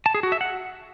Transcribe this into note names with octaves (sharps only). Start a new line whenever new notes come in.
A5
G#4
F#4
E5
F#5